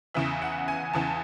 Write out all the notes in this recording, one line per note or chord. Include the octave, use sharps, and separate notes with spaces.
E2 C#3 E3 E5
F#5
G#5
E2 C#3 E3 A5